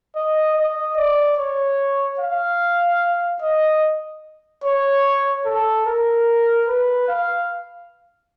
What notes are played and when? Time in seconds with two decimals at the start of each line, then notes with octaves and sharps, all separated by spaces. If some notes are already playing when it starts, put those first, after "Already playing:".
0.15 D#5
0.56 D#5
0.97 D5
1.38 C#5
2.20 F5
3.42 D#5
4.64 C#5
5.46 A4
5.86 A#4
6.67 B4
7.08 F5